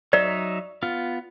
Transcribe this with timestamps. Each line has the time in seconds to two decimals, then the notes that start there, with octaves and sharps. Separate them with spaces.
0.13 F#3 D#4 D5 E5
0.83 B3 F4